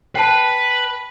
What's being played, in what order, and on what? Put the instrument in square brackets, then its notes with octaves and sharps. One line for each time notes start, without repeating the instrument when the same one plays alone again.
[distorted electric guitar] B4 B5 [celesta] G5 A5